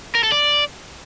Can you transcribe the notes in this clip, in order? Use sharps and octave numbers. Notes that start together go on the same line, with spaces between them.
A#4
A4
D5